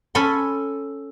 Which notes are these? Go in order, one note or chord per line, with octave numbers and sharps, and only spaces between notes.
C#4 A4 G#5 B5 C6